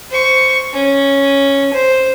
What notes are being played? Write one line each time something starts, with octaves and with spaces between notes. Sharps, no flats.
C5 C#6
C#4
C5